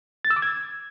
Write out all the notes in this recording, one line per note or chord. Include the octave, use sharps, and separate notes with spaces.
A6
E6
D6
G#6